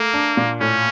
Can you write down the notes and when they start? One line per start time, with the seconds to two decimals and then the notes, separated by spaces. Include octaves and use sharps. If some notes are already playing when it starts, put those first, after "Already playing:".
Already playing: A3 A#3
0.14 D4
0.37 A#2
0.61 A2 C#4